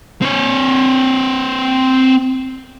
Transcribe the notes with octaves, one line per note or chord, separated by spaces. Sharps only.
C4 C#5